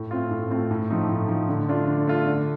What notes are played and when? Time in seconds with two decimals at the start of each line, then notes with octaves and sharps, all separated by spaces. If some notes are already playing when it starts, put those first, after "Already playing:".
Already playing: A2
0.11 A3 C4 F4
0.31 A2
0.50 A3 C4 F4
0.71 A2
0.90 F3 A3 D#4
1.09 A2
1.28 F3 A3 D#4
1.49 D3
1.68 A3 D4 F4
1.87 D3
2.07 A3 D4 F4
2.27 D3